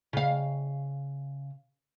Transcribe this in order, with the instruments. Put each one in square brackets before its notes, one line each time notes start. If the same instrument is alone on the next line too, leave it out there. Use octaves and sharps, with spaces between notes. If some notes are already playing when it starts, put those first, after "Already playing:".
[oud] C#3 F5